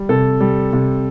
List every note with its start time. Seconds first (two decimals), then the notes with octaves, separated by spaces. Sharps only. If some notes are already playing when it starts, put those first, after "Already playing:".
Already playing: G3
0.09 C3 A4
0.41 G3
0.73 C3